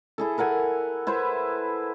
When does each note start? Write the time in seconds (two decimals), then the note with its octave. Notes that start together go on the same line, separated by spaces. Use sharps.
0.18 E4 G#4 A4
0.38 A4 A#4 F#5 G#5
1.07 E4 B4 C5